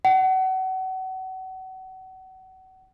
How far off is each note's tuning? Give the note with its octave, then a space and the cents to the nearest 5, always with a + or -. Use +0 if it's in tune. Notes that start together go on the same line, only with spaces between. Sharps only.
F#5 +30